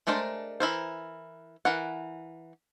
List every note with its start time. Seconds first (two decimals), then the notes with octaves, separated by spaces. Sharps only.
0.07 G#3 A3 D4 A#4 C5
0.60 E3 E4 A#4 C5
1.65 E3 A#4 F#5